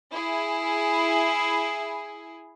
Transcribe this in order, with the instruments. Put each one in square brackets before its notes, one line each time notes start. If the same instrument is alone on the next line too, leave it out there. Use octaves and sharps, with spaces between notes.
[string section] E4 G#4